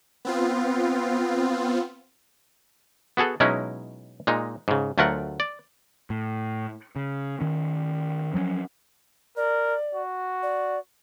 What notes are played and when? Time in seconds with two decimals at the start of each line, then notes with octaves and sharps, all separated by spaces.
0.25 B3 C4 F4
3.17 B3 F#4 G#4 A4
3.40 B2 F#3 G#3 C#4 D#4 E4
4.27 A#2 G#3 D#4
4.68 G#2 C#3
4.98 D2 F#3 A3 F4 A#4 F#5
5.40 D5
6.10 A2
6.96 C#3
7.41 D#3 C#4
8.34 F3 F#3 A#3 C#4
9.37 A#4 D5
9.95 F#4
10.43 D5